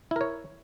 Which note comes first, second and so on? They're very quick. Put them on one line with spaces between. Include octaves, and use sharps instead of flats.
E4 A#4 C#5